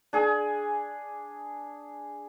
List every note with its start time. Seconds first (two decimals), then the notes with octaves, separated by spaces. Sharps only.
0.13 D4 G#4 G#5